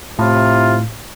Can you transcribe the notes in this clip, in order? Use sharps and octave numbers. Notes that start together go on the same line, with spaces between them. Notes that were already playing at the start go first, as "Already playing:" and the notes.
A2 C3 E4 F4